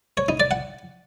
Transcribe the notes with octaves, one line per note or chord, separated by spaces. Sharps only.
C#5
D#4
D5
F#5